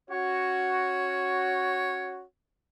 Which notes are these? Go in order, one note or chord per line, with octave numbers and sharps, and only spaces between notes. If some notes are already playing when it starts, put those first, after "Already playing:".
C#4 F#4 C#5